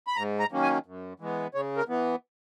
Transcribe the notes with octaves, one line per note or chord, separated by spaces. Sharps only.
B5
G#2 A#5
A#5
D#3 F#3 A#3 C#4
G#5
F#2
E3 G#3 B3
C#3 C#5
A#4
E3 B3